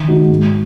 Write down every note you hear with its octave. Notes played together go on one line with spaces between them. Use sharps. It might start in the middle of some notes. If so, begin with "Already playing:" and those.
Already playing: D#3
G#3 D#4 F#4
G#2